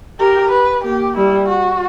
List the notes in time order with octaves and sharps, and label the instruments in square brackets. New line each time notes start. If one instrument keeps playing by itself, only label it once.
[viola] G4 [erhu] A#4
[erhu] B4
[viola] A#3 [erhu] G4
[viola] G3 [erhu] E4
[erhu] F#4